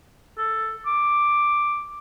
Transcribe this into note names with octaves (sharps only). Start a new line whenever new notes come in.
A4
D6